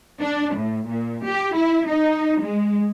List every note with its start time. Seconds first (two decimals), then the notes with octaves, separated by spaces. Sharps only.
0.21 D4
0.55 A2
0.88 A#2
1.25 G4
1.55 E4
1.88 D#4
2.41 G#3